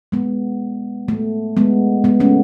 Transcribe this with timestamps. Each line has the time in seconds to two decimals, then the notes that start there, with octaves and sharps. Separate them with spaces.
0.12 G#3 B3
1.08 A3
1.57 G#3 B3
2.04 G#3 B3
2.20 A3 C#4